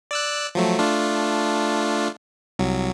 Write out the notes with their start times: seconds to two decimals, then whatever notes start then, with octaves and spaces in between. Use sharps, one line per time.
0.11 D5 E6 F#6
0.55 F3 F#3 A3
0.79 A3 D4 F4
2.59 C2 F#3